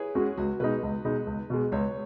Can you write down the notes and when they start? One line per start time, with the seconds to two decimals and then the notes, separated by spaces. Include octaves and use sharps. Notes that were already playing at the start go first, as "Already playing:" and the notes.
Already playing: E4 G#4 B4 C#5
0.15 G#3 C#4 F#4
0.37 C#2 F#4
0.60 B2 G#3 D#4 B4
0.83 C#2
1.05 B2 G#3 D#4
1.27 C#2
1.50 B2 G#3
1.72 C#2 C#5